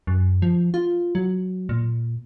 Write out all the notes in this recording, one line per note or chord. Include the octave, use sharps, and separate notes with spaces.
F#2
F3
F4
F#3
A#2